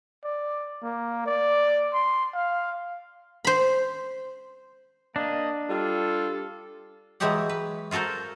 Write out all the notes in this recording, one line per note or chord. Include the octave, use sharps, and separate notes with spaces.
D5
A#3
D5
C6
F5
C5 B5
A#3 D4 D#5
G3 F4 A4
E3 F#3 G#3 F#4 G4 F#5
B4
F4 F#4 A4 A#4 C5